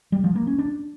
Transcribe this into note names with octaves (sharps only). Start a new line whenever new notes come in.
G3
F3
A#3
C#4
D4